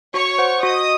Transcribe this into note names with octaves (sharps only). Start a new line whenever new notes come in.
F#4 C#5 C#6
C5 F#5
F#4 D#5 D#6